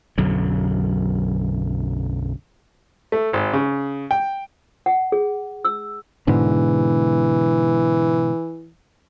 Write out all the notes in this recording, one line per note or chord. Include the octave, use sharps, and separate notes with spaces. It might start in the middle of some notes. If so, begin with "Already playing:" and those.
B1 F#2 D3 F#3
A3
G#1
C#3
G5
F#5
G#4
E6
G#2 B2 D3 E3